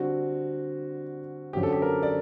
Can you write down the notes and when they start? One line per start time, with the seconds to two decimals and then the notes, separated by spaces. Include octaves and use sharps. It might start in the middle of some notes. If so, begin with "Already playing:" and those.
Already playing: D3 G3 C4 F#4
1.53 F#2 D3 F#3 C4 G4
1.63 A4
1.72 G4
1.82 A#4
2.03 D5